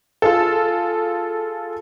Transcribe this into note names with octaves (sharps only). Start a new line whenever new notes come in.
F4 G#4 A4